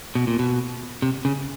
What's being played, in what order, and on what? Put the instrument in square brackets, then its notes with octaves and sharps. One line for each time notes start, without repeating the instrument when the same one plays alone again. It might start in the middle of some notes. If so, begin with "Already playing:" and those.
[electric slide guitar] B2
A#2
B2
C3
C#3